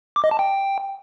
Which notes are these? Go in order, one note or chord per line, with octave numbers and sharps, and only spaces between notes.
D6
D#5
A5
G5